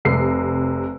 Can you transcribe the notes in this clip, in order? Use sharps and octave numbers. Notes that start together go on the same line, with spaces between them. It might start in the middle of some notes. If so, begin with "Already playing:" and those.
F1 C3 C7